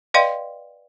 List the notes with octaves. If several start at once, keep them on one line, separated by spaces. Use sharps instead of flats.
B4 D5 D#5 F5 G5 C6